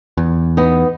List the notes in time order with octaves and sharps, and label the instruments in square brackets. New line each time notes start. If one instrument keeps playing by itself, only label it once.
[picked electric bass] E2
[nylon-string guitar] B3 D#4